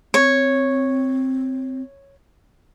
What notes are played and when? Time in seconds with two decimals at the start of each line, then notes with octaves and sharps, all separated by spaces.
0.14 C4 C#5